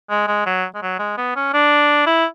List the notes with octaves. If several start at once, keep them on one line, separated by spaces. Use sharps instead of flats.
G#3
G#3
F#3
G#3
F#3
G#3
B3
C#4
D4
E4